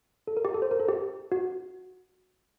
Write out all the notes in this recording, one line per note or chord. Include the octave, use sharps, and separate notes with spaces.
A4
A#4
G4
A4
C5
A#4
A4
G4
F#4